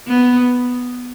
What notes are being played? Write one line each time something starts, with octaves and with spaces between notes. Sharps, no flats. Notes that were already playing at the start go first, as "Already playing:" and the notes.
B3